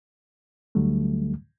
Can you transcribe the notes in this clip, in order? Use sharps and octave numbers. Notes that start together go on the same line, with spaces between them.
D2 D3 F#3 G3 A3